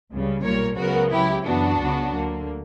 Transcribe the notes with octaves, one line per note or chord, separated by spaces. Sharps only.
C#2 C#3 G3
B1 A#2 G3 A#4 C#5
C#2 C#3 F#3 B3 F#4 A#4
C#2 C#3 F#3 E4 G4
F#2 E3 B3 D4 F#4
C#2 C#3 F#3 B3
D2 D3 A#3